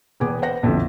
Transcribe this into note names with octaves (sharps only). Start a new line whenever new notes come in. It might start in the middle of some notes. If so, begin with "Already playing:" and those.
E1 E2 B3 G#4 G#5 D6
B4 C5 F#5 A#6
B1 F2 B2 D3 E3